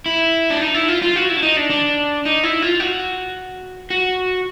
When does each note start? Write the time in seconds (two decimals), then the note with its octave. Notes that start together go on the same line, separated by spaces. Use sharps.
0.06 E4
0.50 D4
0.61 D#4
0.74 E4
0.88 F4
1.02 F4
1.16 F#4
1.29 E4
1.37 D4
1.43 D#4
1.57 D4
1.70 D4
2.25 D#4
2.43 E4
2.62 F4
2.80 F#4
3.90 F#4